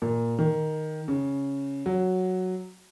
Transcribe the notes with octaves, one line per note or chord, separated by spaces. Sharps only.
A#2
D#3
C#3
F#3